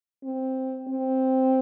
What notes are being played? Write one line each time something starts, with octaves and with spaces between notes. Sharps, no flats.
C4
C4